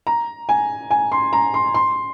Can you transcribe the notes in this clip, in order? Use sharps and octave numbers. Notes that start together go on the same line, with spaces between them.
A#5
G#5
G#5
C6
A#5
C6
C6